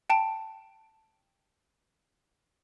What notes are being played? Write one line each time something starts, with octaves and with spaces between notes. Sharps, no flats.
G5 A5 D7